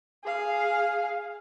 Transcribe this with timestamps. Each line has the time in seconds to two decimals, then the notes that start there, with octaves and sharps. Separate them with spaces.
0.24 G#4 F5